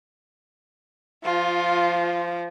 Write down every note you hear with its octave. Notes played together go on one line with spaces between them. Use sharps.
F3 F4